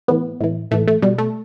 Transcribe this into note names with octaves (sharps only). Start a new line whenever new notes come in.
A2 E3 B3
A2 E3
A2 E3 A3
A3
B2 G3
A3